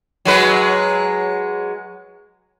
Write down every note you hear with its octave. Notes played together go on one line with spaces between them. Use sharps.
F#3 G#3 B4